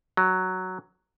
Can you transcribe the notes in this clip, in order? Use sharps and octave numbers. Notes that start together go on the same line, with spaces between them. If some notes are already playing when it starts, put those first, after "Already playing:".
F#3